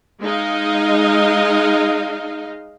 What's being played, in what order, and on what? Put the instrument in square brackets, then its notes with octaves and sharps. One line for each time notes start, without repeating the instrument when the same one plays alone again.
[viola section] G#3 D#4 D#5 F5